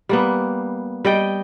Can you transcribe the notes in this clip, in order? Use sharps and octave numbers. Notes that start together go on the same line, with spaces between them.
G3 A#3 B3
G3 D#5 G5